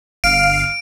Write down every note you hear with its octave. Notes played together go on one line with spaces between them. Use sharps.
G1 F5 D7